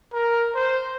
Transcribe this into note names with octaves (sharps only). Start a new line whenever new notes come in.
A#4
C5